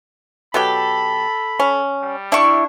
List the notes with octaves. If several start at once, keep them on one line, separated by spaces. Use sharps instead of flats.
B2 F#3 G4 A4 B5
C#4
G3
D4 E4 C#6